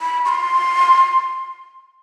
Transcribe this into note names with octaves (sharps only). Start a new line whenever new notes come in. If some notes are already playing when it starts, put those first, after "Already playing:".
B5
C#6
C6